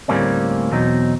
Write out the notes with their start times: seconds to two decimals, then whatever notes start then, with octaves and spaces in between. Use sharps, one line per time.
0.08 D2 A2 G3 A#3 C4 C#4
0.72 E2 B2 F#3 C4 D#4